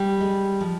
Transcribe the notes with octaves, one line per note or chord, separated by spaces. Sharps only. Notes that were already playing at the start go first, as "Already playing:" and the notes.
Already playing: G3
G#3
F3